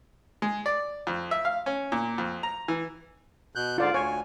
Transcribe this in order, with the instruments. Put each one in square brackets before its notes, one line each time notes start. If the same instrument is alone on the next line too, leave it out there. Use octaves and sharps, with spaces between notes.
[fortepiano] G#3
D5
F2
E5
F5
C#4
A#2
F2
A#5
E3
[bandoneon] B2 F#6 G6
[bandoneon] G#2 D3 [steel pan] F4 D5
[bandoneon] D2 G#5 [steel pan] C#5